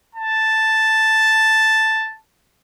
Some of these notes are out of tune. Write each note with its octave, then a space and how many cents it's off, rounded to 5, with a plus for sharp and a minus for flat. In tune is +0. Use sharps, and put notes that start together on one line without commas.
A5 +0